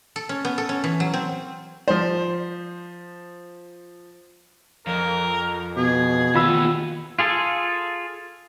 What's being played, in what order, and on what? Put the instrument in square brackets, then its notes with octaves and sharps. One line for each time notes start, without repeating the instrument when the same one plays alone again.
[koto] A4
C#4
B3
A4
C#4
E3
F#3
C4
[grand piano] F3 C5
[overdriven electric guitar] F2 [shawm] A#4
[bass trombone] B2 [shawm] G#4
[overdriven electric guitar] D#2 B3 [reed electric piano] F4 B5 E6
[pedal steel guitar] F4 G#4 A4